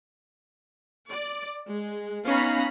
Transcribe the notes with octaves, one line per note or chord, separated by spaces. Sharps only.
D5
G#3
B3 C#4 D#4 F5 A#5 B5